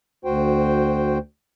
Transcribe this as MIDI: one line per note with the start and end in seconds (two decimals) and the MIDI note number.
0.25 1.18 38
0.25 1.18 66
0.25 1.18 72
0.25 1.18 79